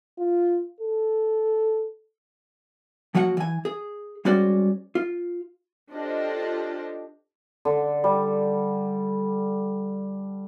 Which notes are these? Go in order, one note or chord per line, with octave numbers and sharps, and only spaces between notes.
F4
A4
F3 F#3 A#3 F#4 F#5
E3 G#5
G#4
G3 G#3 C#4 F#4 C5 D5
F4
D4 F4 G4 A4 C5 D#5
D3
G3